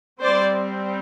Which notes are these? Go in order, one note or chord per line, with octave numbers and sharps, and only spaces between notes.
G3 C4 C5 D5